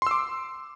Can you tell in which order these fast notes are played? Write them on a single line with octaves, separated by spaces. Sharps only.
C6 E6 D6